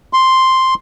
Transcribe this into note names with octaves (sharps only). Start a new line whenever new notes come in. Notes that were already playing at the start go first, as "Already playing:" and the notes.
C6